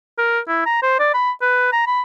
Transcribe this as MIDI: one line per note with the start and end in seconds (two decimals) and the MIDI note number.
0.18 0.39 70
0.48 0.61 64
0.66 0.79 82
0.82 0.95 72
0.99 1.10 74
1.14 1.31 83
1.42 1.70 71
1.73 1.86 82
1.87 2.02 83